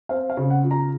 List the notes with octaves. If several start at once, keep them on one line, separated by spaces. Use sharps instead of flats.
C4 F5
F5
C#3
F#5
F4
A#5